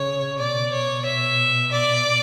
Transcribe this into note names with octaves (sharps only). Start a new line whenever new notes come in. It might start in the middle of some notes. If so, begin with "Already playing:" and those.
Already playing: C#3 C#5
B2 D5
C#5
E5
D5